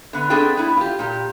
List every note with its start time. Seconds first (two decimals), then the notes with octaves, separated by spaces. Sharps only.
0.13 D3 B3
0.30 B3 C4 D4 G#4 A4 G5
0.57 B3 E4
0.77 F4 G4
0.99 A#2 G4